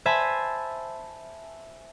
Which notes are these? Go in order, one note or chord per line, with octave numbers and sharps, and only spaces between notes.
C5 E5 G#5 A5 B5